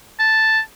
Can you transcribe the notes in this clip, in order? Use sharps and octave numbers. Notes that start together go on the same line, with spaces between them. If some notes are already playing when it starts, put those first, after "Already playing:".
A5